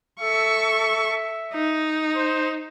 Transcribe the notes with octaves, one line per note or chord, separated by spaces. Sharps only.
A4 E5 C#6
D#4
C5